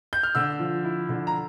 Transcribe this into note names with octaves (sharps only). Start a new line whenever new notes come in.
G6
F6
D3 E6
F3
E4
D3
A#5